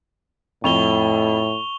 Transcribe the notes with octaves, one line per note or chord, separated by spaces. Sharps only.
F2 A2 C#6 F7 G7